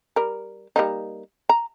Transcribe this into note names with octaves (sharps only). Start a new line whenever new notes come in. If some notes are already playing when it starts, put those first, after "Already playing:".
G3 A#4
G3 A#3 D#4
A#5